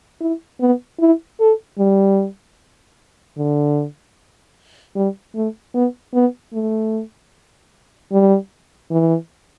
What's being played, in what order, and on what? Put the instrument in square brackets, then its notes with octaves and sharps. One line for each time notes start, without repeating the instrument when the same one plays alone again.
[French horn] E4
B3
E4
A4
G3
D3
G3
A3
B3
B3
A3
G3
E3